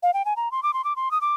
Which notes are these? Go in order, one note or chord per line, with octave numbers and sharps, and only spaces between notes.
F5
G5
G#5
A#5
C6
D6
C6
D6
C6
D#6
D6